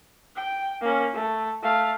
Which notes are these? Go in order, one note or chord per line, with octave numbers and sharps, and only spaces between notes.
G5
A#3 C#4
A3
A3 F5